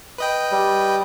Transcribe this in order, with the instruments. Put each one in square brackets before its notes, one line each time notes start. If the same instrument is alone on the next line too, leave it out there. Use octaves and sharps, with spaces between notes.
[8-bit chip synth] B4 D#5 G5
[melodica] G3